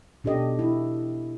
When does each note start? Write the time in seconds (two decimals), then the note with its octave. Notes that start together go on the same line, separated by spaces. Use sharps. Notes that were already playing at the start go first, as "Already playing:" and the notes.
0.24 B2 D4 G4 A4 D#5
0.59 E4